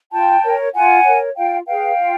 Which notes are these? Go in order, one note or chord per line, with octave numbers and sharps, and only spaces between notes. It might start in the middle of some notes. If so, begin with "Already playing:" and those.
F4 G5 A5
A#4 C#5
F4 F#5 G#5
A#4 C#5
F4 F5 G5
G#4 B4 F5 G5
F4